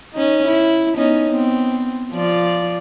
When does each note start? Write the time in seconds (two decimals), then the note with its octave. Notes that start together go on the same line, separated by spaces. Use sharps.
0.13 C#4 D#4
0.46 E4
0.96 B3 C#4 D#4
1.28 B3 C4
2.12 F3 F4 D5